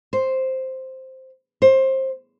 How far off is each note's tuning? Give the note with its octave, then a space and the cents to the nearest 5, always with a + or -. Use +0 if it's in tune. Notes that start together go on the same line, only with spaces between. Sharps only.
C5 +0
C5 +20